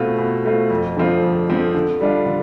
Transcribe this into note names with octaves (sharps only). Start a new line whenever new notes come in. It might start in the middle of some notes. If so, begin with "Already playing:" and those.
Already playing: B2 A3 C4 F4
B2
A3 C4 F4
F2
D3 F3 C4 F4
F2
D3 F3 C4 F4
D3
G3 D4 F4
D3